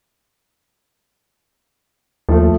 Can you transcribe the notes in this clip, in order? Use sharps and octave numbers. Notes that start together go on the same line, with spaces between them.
D#2 F3 A3